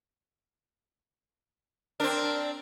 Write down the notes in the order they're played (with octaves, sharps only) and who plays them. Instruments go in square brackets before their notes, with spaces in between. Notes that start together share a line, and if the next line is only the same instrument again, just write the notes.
[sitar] C4 D4 [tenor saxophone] A#4